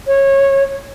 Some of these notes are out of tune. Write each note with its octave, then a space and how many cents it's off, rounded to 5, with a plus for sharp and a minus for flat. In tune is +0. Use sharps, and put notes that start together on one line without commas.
C#5 -20